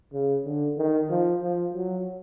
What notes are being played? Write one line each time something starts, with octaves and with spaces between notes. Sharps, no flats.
C#3
D3
D#3
F3
F3
F#3